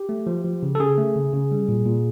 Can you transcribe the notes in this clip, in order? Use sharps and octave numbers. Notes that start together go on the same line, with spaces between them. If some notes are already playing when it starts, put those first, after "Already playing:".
Already playing: G4
A3
F3
F3
C#3
A4
C#3 G#4
A3
C#3
C#3
G3
A#2
A#2